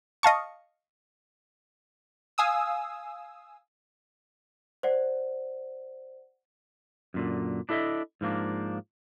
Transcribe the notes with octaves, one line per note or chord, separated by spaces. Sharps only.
D#5 F5 A5 C#6
F5 G#5 D#6 E6
C5 D5 F#5
F#2 A#2 D3
D4 E4 A4 D#5 E5
G#2 F3 A#3 D4